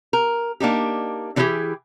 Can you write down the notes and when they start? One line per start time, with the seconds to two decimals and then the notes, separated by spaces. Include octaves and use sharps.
0.13 A#4
0.60 A#3 D4 D#4 G4
1.36 D3 E3 A3 E4 G4 G#4